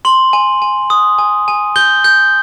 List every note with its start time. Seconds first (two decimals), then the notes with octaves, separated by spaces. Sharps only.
0.05 C6 F#7
0.33 G#5
0.62 G#5
0.90 D#6
1.19 G#5
1.48 G#5
1.76 G6 G7
2.04 G6